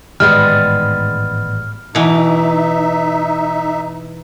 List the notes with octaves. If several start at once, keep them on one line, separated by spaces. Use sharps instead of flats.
A1 G#2 D#3 G3 G#3 B3 F6
B2 E3 D#4 E5